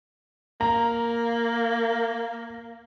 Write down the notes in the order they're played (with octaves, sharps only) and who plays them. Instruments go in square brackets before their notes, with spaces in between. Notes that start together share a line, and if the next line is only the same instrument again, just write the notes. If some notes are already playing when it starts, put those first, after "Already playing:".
[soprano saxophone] A#3 [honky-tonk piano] A#5